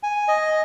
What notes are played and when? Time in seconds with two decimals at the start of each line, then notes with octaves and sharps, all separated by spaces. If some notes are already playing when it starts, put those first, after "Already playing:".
0.03 G#5
0.28 D#5